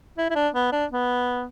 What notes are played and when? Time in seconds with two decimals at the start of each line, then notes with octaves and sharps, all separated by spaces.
0.18 E4
0.30 E4
0.35 D4
0.54 B3
0.72 D4
0.92 B3